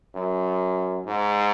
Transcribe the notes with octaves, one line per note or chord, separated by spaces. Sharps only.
F#2
G#2